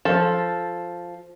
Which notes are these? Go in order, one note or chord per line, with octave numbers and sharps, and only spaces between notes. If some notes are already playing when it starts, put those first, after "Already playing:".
F3 A4